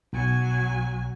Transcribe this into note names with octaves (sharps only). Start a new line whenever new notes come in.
B1 F#3 G#5